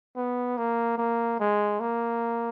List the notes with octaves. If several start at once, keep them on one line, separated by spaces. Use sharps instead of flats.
B3
A#3
A#3
G#3
A#3